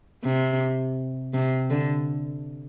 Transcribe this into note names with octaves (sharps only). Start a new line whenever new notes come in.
C3
C3
D3